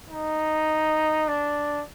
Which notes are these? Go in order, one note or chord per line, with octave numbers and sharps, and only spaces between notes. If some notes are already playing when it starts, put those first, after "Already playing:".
D#4
D4